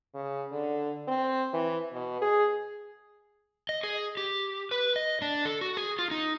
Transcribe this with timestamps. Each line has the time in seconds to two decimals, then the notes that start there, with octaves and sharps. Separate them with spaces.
0.15 C#3
0.51 D3
1.08 C4
1.53 E3
1.93 B2
2.22 G#4
3.69 D#5
3.84 G#4
4.17 G4
4.71 B4
4.96 D#5
5.22 D4
5.45 A4
5.61 F#4
5.77 G#4
5.99 F4
6.11 D#4